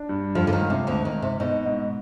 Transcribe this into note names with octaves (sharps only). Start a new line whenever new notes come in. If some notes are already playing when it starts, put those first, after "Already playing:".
Already playing: D4
G2
F2 F3 F4
D3
D#2 D#3
G#2
C3
D2 G#2 D3
D#2 D#3
G#2
C3
B2 D#4
G#2